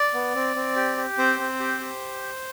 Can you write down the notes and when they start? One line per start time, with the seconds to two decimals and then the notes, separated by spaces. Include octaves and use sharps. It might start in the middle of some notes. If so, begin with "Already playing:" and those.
Already playing: D5
0.14 B3
0.35 C4
0.56 C4
0.76 G4
0.97 G4
1.18 C4 C5
1.40 C4
1.60 G4
1.81 G4